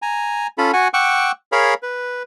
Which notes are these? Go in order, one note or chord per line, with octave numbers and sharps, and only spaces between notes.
G#5 A#5
C#4 F4 A4 B5
F#4 F#5 G#5
F#5 G5 C#6 D6 E6 F#6
G#4 A#4 C#5 F5 B5
B4